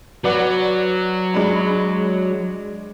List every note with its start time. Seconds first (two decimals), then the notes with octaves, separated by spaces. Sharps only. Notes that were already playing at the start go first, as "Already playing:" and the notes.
0.24 F#3 B4 D5 F#5
1.34 G#3 D4 B5